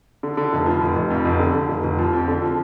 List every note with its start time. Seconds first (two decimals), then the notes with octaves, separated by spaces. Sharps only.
0.23 D3
0.37 D3
0.53 F1
0.66 F3
0.82 F1
0.96 F1
1.10 F2
1.25 F1
1.39 D3
1.54 D3
1.69 F1
1.84 F1
1.99 F3
2.13 F2
2.28 D3
2.42 F3